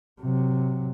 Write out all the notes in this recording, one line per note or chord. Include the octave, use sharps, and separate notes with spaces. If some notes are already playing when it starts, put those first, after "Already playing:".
C3 F#3